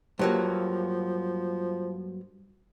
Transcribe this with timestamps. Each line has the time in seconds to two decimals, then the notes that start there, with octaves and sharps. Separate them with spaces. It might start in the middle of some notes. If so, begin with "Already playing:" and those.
0.19 G2 F3 F#3 A#3